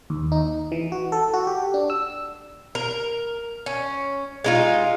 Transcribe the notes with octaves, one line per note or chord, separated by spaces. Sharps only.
D#2
D#4
E3
F#4
A4
F#4
G4
D4
E6
A#4
C#4
G#3 D#4 F4